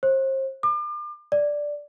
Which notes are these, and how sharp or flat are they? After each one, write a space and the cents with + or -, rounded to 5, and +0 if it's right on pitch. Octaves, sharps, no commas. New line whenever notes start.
C5 +35
D6 +35
D5 +0